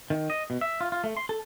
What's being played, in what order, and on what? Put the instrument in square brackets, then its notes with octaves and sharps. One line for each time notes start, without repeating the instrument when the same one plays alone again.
[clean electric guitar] D#3
D#5
B2
E5
F4
F4
A3
C6
A4